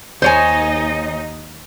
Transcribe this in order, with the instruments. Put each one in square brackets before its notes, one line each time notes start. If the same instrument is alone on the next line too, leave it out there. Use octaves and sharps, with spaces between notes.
[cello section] D#2 D#4 D#5 [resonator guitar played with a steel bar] C5 C#5 G#5